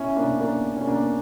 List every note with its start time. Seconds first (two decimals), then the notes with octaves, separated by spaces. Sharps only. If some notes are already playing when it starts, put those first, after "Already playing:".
Already playing: C#4 E4
0.16 A#3 D4
0.40 A#3 D4
0.77 C#4
0.87 A#3 D4